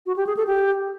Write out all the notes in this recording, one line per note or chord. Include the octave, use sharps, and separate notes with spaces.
F#4
G4
G#4
A4
G4